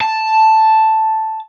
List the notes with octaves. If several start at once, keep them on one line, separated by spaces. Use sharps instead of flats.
A5